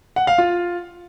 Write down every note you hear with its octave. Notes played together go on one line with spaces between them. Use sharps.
F#5
F5
F4